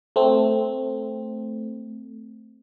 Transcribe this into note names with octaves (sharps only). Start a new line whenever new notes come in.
A3 C4